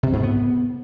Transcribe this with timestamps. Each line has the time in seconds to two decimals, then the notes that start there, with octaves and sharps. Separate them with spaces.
0.03 C3
0.13 G#2
0.23 B3